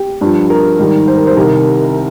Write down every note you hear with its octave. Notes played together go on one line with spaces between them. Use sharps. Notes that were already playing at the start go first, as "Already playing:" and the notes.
Already playing: G4
G2 F3
A#4
G#2 D#3 G3
C5
A#4
C5
C2 C3 D#3 A#4